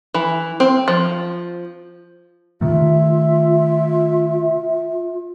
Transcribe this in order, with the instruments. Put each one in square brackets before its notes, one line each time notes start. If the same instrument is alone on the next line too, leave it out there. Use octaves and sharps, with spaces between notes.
[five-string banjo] E3
C4
F3
[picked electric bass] C3 D#3 A3 [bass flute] F4 [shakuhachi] E5